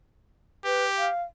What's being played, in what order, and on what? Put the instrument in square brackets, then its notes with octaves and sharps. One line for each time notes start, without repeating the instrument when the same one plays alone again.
[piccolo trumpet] G4 [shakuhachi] B4
[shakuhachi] F5